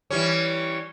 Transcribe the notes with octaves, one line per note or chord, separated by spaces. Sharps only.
E3 G3 C#4